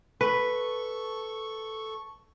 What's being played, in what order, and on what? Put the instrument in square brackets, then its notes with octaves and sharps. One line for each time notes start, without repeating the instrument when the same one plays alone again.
[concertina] A4 C#6 [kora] B4